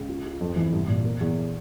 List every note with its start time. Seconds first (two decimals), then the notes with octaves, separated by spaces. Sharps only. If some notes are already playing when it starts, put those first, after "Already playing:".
Already playing: C#2
0.09 F4
0.25 F4
0.40 F2
0.56 E3
0.73 C2
0.88 A#2
1.05 A#3
1.21 E2